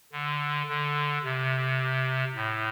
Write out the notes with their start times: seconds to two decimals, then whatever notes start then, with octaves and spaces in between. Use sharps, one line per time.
0.12 D3
0.68 D3
1.24 C3
2.35 A2